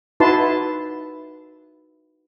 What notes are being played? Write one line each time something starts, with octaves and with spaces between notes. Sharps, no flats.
D#4 E4 F#4 B4 A5 C6